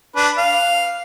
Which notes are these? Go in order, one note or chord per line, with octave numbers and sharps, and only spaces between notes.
D4 B4
F5